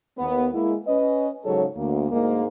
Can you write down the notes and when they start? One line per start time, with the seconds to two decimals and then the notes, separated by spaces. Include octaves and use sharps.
0.19 D#2 B3
0.54 G#3 A#3 E4
0.87 C#4 B4 D#5
1.44 G#2 C#3 F#3 G#4 A4 C#5
1.77 D2 A#3
2.11 D2 G#2 G#3 A#3